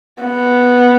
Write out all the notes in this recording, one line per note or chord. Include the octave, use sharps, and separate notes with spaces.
B3